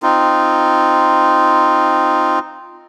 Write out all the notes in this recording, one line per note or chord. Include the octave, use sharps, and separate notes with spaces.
C4 D#4 F4